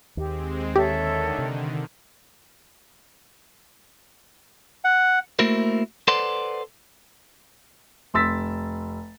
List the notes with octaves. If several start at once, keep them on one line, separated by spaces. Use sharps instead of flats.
D#2 G#3 C4 G4
D3 D#3 G4 A4 C#5 E5
C3
F#5
A3 A#3 E4 F#4 A#4 C5
A4 B4 C5 D5 F#5 C6
F1 C6 E6 A6 B6